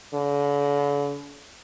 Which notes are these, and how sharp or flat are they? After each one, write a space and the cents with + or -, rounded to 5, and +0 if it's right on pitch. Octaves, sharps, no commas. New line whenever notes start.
D3 -45